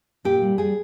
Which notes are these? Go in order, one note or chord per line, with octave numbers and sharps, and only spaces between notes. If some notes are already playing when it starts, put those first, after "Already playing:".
A#2 G4
G3
G3 G#4